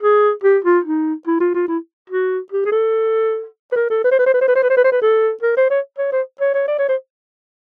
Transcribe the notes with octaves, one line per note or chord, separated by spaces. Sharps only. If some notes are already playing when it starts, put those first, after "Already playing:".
G#4
G4
F4
D#4
E4
F4
F4
E4
F#4
G4
G#4
A4
B4
A#4
A4
B4
C5
B4
C5
B4
C5
B4
C5
B4
C5
B4
C5
B4
A4
A#4
C5
C#5
C#5
C5
C#5
C#5
D5
C#5
C5